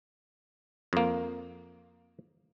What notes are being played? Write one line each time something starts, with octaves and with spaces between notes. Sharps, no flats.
F2 A#3